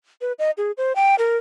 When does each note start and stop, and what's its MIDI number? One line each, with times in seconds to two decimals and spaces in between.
0.21 0.33 71
0.39 0.51 75
0.58 0.72 68
0.77 0.93 72
0.96 1.15 79
1.19 1.37 70